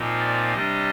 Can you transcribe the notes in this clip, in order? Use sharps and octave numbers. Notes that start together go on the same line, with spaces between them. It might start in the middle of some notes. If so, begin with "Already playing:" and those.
Already playing: A#2 F3 C4 D#4
D5
C3 G3 D4 D#5